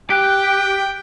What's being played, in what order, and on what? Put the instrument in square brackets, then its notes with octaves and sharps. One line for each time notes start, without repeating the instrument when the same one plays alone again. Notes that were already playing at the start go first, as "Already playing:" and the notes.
[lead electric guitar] G4 [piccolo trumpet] G5 [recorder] F#6